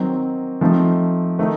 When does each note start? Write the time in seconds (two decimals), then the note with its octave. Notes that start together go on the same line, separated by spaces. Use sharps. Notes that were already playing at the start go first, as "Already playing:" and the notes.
Already playing: D#3 F#3 C4 D#4
0.61 F3 A3 C4 D#4
1.39 D#3 A3 D#4